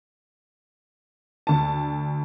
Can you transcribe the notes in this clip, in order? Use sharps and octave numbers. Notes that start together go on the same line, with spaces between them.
D2 A5